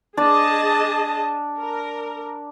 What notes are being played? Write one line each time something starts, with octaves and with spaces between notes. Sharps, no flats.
D4 G#4 D5 D#5 A5
A#4